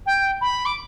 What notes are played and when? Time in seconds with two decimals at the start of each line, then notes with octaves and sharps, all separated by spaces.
0.06 G5
0.41 B5
0.65 D6